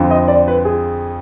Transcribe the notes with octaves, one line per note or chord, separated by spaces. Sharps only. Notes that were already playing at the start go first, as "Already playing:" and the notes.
Already playing: F2 D3 F3
D#5
D5
B4
G#4